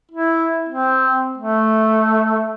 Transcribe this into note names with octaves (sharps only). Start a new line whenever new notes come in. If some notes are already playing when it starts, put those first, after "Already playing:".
E4
C4
A3